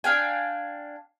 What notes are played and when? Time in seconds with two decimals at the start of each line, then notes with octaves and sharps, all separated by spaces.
0.04 D4 F5 G5 G#5